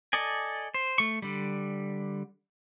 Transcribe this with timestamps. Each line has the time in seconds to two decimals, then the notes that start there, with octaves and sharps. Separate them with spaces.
0.13 A4 D5 D#5 G#5
0.74 C5
0.98 A3 C#6
1.22 D3 G3